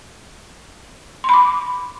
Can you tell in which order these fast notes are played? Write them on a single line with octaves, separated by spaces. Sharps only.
C6 B5 D6